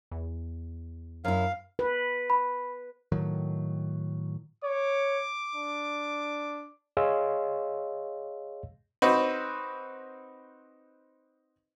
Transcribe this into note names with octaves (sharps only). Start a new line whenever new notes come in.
E2
F#2 E4 F5
B4
B5
A2 D#3 F#3
C#5 D6
D4
G#4 C#5 D#5 F5 C6 E6
C4 D#4 F#4 B4